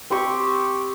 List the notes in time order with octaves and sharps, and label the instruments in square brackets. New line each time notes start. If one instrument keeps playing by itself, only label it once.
[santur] C4 G4 C#6